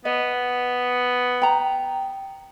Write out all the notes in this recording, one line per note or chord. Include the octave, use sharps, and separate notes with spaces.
B3 D#5
G5 A#5